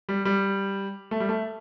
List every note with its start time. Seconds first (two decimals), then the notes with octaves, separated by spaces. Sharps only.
0.09 G3
0.25 G3
1.11 A3
1.20 G3
1.29 A3